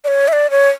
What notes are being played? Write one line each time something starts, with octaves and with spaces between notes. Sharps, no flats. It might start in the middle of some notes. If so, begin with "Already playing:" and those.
D5
C#5
E5
D5
C#5